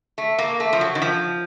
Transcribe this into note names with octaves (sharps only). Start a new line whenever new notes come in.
A3
A#3
A3
F3
F#3
D#3
F3